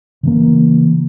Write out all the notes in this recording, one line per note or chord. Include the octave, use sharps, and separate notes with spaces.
C#3 E3 A#3